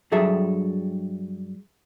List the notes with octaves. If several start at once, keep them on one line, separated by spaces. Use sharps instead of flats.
G2 F#3 G#4 A4 E5